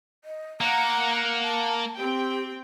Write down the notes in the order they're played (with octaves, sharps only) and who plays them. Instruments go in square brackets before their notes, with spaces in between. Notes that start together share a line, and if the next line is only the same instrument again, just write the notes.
[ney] D#5
[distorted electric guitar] A#3 [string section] F#5 [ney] A#5
[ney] A5
[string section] C4 G5 [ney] G4